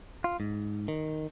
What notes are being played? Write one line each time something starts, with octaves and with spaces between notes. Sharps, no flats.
F4
G#2
D#3